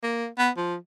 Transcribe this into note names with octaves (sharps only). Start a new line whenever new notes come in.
A#3
B3
F3